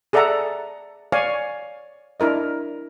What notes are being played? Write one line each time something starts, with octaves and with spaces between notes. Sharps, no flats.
G#4 A4 D5 E5 F#5 A#5
C#5 D5 F5 G#5
D4 E4 A#4 D#5